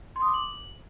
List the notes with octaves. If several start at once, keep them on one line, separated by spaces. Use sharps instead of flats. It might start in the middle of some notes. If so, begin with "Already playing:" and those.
C6
D#6
D6
F#7